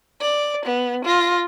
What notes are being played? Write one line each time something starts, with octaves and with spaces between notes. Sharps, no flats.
D5
B3
F4 A#6